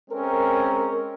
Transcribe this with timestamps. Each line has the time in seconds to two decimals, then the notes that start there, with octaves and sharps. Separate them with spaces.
0.11 G#3 C4 C#4 A#4